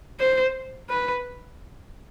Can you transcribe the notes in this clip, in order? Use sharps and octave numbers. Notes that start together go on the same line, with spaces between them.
C5
B4